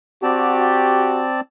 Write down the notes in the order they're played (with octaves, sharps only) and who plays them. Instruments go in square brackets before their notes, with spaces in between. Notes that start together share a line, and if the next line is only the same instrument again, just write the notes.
[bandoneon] C4 D5 A5 [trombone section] F#4 G4